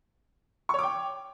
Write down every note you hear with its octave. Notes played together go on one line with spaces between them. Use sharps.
C#5 G5 C#6 D6